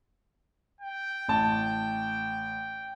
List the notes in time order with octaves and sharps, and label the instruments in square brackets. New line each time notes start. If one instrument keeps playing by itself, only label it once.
[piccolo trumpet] G5
[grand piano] A1 A5